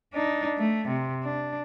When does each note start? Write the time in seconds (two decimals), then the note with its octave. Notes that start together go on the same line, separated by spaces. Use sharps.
0.14 D4 D#4
0.58 A3
0.88 C3
1.23 D4